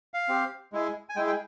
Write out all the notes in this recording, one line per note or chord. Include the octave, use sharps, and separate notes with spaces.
F5
C4 G4
G#3 E4 G#4
G#5
G#3 E4 G#4 G5
G5